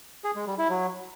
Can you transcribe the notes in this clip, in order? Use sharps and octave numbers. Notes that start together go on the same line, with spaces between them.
G#4
G#3
G3
E4
F#3